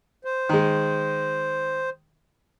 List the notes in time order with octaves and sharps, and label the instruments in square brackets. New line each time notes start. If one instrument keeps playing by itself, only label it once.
[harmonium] C5
[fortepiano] D#3 G#3